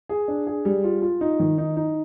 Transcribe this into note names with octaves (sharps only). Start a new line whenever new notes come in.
G#4
D4
G#4
G3
F4
F4
D#4
D#3
D#4
D#4